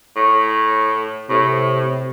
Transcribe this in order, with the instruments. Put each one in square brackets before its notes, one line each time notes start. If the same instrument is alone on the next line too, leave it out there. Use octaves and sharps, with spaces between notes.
[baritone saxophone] A2
[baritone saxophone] A2 [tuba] C3